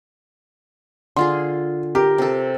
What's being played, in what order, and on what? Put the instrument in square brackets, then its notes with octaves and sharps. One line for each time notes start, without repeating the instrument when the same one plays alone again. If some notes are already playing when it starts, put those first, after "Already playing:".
[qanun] D3 F4 G#4 [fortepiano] C6
[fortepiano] G4 [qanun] A#4
[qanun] C3 A4